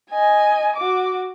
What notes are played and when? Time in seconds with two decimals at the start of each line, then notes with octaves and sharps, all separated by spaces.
0.11 D#5 G#5
0.76 F#4 D6